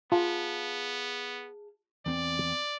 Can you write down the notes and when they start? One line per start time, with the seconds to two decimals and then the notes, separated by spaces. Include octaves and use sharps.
0.12 B3 F4 G#4 F5 A5
2.06 E2 C4 D5